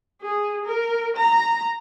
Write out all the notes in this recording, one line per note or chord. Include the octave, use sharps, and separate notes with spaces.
G#4
A#4
A#5